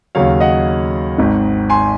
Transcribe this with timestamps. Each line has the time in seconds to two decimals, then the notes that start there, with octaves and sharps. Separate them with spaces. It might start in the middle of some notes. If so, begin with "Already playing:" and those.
0.15 D#2 C#3 F#3 C#5 F5
0.40 D#5 F#5
1.18 G#1 G#2 D#3
1.70 G#5 C6